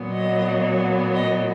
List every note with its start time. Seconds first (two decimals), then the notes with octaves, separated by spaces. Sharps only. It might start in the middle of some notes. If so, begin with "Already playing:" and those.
Already playing: A#2 F#3 B3
0.12 D#5
1.14 D#5